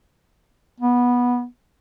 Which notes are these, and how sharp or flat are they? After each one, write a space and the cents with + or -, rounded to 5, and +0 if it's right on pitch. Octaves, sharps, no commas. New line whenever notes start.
B3 -15